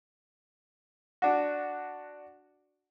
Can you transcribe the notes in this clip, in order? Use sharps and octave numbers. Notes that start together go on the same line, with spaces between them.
D4 F#4